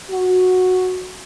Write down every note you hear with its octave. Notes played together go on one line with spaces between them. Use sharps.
F#4